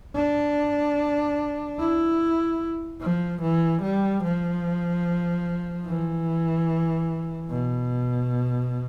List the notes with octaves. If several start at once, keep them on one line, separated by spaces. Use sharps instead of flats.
D4
E4
F3
E3
G3
F3
E3
B2